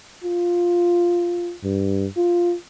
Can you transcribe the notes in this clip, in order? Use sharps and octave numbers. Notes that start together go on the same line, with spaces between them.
F4
G2
F4